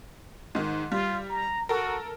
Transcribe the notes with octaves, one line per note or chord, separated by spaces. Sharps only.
G#2 D#3
G3 F4
A#5
F#4 A4 A#4